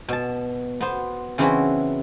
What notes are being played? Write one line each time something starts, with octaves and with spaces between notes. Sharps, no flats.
B2 A5
B3 C5
C#3 E3 C4 D4 E4 F#4